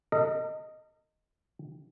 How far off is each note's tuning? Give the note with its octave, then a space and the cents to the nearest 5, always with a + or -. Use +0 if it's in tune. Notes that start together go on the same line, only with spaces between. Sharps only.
A#4 -40 D#5 +0